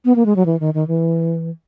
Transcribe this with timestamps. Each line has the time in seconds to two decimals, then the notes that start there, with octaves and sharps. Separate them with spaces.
0.05 B3
0.16 A#3
0.26 G#3
0.36 F#3
0.46 E3
0.60 D#3
0.74 D#3
0.88 E3